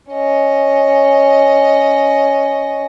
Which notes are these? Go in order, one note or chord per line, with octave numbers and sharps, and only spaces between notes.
C#4 D#5